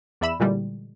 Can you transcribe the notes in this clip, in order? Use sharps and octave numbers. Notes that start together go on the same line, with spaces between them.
E2 D5 E5 B5 E6 E7
A#2 D3 E3 G3 G#3